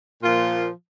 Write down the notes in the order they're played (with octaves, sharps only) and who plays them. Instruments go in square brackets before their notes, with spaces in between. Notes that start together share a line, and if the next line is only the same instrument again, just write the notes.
[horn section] A#2 F3 F4